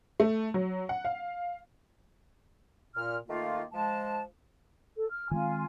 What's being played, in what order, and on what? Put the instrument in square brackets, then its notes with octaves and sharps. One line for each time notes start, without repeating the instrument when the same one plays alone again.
[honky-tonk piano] A3
F#3
F#5
F5
[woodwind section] A#2 F6
D#3 A3 A#3 F4
F3 G#3 A5
[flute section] A4
F6
[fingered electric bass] D#3 G#3 C4 [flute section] F4 G#5